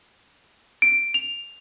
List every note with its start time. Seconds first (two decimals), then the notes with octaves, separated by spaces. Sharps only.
0.82 D7
1.14 F7